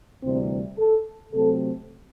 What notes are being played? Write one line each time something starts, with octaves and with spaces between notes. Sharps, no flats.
D2 C3 E3 G3 C4
A4
C3 F#3 A3 C4 A4